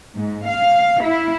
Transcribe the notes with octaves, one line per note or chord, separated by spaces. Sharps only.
G#2
F5
E4